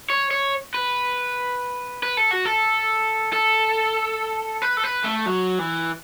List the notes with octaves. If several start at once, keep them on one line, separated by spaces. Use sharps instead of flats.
C#5
C#5
B4
B4
A4
F#4
A4
A4
B4
A4
B4
A3
F#3
E3